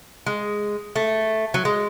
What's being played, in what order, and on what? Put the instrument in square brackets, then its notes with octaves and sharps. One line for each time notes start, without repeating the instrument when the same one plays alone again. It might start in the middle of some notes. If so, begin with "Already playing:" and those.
[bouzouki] G#3
A3
F#3
G#3